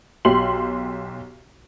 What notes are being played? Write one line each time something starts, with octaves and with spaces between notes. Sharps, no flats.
B1 G4 C6 F#7